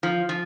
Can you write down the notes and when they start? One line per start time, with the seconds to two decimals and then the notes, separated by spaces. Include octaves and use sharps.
0.03 F3
0.29 F3